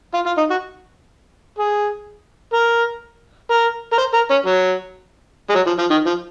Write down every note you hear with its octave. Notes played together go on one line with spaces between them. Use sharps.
F4
F4
D#4
F#4
G#4
A#4
A#4
A#4
C5
A#4
C#4
F#3
G#3
F#3
F3
F3
D#3
F3